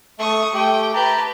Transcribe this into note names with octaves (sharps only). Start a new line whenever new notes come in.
A3 C#6 D#6
A3 G4 G5
G4 B4 A5 A#5